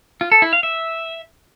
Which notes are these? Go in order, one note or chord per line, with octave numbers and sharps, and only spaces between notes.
F4
A4
E4
F5
E5